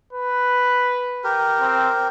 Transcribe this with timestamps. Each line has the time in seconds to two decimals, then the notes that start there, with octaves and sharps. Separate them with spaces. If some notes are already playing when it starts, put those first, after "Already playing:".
0.13 B4
1.24 G4 A#4
1.60 C4